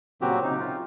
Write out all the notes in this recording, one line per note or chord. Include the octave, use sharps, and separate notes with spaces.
A#2 C#3 F#3 C4 F#4 G4
C3 D#4
F4